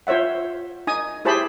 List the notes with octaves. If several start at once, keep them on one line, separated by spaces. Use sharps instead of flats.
F4 C5 C#5 E5 F#5
D#4 G#5 D#6
E4 G4 G#4 C5 A5 B5